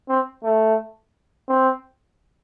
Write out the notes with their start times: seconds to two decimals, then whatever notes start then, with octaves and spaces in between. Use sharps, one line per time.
0.09 C4
0.44 A3
1.49 C4